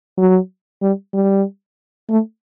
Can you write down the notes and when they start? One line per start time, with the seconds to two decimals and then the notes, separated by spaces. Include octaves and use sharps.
0.18 F#3
0.82 G3
1.14 G3
2.09 A3